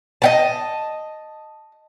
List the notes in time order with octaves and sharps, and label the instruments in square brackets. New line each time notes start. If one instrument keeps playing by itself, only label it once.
[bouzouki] D#5 G5 A5